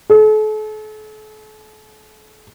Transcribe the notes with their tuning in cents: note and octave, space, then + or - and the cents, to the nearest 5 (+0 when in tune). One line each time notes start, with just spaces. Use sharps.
A4 -40